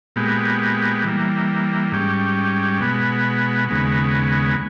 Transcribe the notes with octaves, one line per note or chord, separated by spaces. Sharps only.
A#2 G#3 B3 G4
E3 G3 A#3
G#2 G3 C#4 G4
B2 G#3 B3
D#2 C#3 G#3 B3